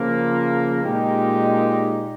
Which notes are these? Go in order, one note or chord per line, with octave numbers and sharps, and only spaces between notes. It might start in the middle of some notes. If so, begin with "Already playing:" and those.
Already playing: C#3 F3 A#3 F4
A#2 G#3 D#4 G4